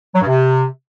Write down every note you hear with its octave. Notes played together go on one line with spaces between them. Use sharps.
F#3
G2
C3